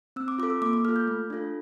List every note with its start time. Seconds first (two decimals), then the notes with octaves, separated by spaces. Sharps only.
0.16 C4 E6
0.28 D6
0.38 F4 D6
0.43 A4
0.50 E6
0.62 A#3 D6
0.73 D6
0.85 F4 A4 F6
0.96 G6
1.07 A3
1.30 D4 F4 A4